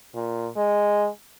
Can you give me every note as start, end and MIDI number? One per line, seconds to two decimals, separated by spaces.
0.15 0.48 46
0.57 1.07 56